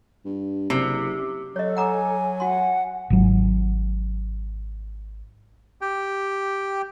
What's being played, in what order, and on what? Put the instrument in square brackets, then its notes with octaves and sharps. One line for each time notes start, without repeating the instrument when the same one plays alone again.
[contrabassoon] G2
[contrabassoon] F#1 [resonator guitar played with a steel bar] C3
[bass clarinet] F#3 [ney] A4 [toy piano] C#5 D#5
[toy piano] F#5 A#5 D6 [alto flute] G#5
[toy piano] F#4 C6 [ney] F#5
[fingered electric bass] G#1 F#3
[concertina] G4 G5